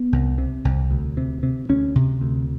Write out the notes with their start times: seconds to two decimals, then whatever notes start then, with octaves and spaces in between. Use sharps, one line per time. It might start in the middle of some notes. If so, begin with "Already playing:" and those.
Already playing: B3
0.12 C2
0.38 C3
0.65 C2
0.91 D2
1.17 C3
1.43 C3
1.69 D2 C#4
1.95 C3
2.21 D2